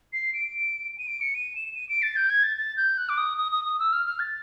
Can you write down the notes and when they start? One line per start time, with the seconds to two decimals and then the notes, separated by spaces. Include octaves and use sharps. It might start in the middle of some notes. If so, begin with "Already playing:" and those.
0.13 C7
0.33 D7
0.98 D#7
1.08 D7
1.21 C#7
1.35 D#7
1.55 E7
1.75 D#7
1.89 D7
2.02 A6
2.16 G6
2.30 G#6
2.43 A6
2.57 A6
2.77 G6
2.98 F#6
3.09 D6
3.18 D#6
3.38 D#6
3.52 D#6
3.65 D#6
3.79 E6
3.92 F6
4.06 F6
4.20 A6